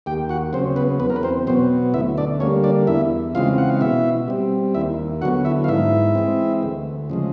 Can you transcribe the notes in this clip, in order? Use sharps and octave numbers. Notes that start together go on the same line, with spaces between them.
D#2 G4 G5
F#4 F#5
C#3 F#3 C4 C5
B3 B4
E2 B3 B4
A#4
B4
C4 C5
B2 F#3 B3 C4 C5
D2 E4 E5
D4 D5
D3 G3 A#3 C#4 C#5
D4 D5
E2 E4 E5
C#3 E3 G#3 C4 F4 F5
F#5
F5
B2 E4 E5
G3 C4
D#2 E4 E5
D3 F#3 B3 F#4 F#5
E4 E5
F5
G#2 E4 E5
E3 G#3 C4
D2
C#3 F3 G#3